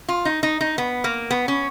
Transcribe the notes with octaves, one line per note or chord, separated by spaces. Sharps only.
F4
D#4
D#4
D#4
B3
A#3
B3
C#4